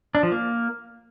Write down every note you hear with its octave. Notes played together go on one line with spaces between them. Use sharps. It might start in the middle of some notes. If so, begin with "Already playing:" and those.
D4
F3
A#3